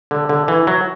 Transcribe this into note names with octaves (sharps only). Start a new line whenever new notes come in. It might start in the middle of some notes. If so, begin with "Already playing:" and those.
D3
D3
E3
F#3